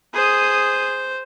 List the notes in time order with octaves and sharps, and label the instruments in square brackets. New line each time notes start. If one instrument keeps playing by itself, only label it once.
[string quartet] G#4 D#6 [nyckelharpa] C5